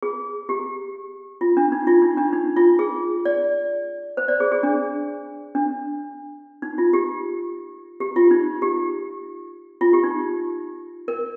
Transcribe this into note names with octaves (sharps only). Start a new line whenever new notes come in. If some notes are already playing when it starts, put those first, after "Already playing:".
G#4
G4
F4
D4
D#4
F4
D#4
D4
D#4
F4
G#4
D5
C5
D5
G#4
G#4
D4
D4
D#4
F4
G4
G4
F4
D#4
G4
F4
G4
D#4
A#4